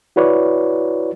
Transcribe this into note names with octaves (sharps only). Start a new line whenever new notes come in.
E4 F#4 B4 C#5 D5